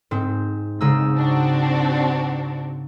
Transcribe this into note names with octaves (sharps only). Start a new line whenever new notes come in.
G#2 C4
G#2 C#3 D#4 E6
C4 D4 F#4